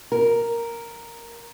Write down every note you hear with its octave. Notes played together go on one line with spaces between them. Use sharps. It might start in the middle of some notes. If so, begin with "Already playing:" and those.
A#4